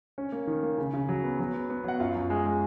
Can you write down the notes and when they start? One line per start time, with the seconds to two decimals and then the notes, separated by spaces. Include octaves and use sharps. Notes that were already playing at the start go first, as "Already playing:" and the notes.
0.18 C#4
0.32 A#3
0.47 D#3
0.63 A#3
0.78 C#3
0.94 C#3
1.09 F#3
1.24 B3
1.39 F#3
1.54 B3
1.70 B3
1.84 F#3 F#5
2.00 F#2 F4 F5
2.15 F#2
2.30 G#3
2.46 G#3